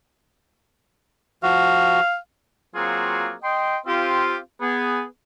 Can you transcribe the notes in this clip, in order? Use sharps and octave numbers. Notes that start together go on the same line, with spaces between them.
F3 F#4 F5
F#3 A#3 C4 F4 F#4 G#4
D#5 G5 C6
C4 F4 G4
B3 G#4